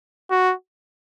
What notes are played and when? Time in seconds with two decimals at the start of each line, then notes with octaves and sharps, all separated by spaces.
0.31 F#4